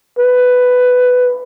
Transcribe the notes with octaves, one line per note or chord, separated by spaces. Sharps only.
B4